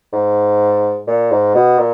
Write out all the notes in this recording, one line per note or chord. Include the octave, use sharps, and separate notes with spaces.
G#2
A#2
G#2
B2
A#2